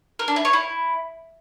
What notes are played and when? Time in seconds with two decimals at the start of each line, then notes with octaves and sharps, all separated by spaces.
0.19 A#4
0.28 D4
0.36 E4
0.45 C#5
0.53 E4